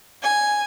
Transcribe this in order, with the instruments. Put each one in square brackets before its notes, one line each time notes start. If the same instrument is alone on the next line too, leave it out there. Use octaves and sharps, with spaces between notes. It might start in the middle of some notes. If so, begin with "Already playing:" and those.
[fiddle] G#5